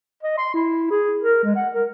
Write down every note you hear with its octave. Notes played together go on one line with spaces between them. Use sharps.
D#5
C6
E4
G#4
A#4
G#3
F#5
A#4